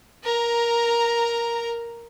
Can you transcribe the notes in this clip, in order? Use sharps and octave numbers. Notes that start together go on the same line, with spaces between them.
A#4 A#5